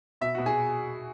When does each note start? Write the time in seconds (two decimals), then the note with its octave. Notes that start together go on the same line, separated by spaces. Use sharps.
0.21 B2 E5
0.35 B2 F#4
0.46 G#4